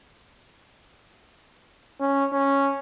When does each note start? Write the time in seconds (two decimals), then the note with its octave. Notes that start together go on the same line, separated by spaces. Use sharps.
2.00 C#4
2.33 C#4